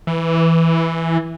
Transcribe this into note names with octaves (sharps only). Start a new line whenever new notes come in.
E3